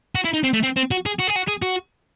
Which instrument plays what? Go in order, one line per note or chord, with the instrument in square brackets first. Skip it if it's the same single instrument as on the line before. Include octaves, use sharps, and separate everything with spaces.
[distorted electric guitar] F#4
E4
D#4
C4
A3
C4
C4
F#4
G#4
F#4
G#4
F#4
G#4
F#4